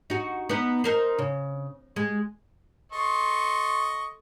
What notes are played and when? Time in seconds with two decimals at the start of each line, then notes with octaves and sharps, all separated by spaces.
0.10 D#4 F#4
0.49 B3 D#4
0.84 D#4 A#4 C5
1.19 C#3
1.96 G#3
2.92 A4 D#5 C6 C#6